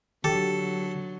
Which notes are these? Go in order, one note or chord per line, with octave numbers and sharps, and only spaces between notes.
D3 F#3 G4 A4